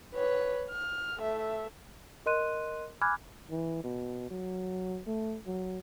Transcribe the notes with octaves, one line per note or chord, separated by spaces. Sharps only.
B4 C#5
F6
A3 E5
A#4 D#5 C6 F#6 D#7
G#5 B5 D6 F6 F#6 G#6
E3
B2
F#3
A3
F#3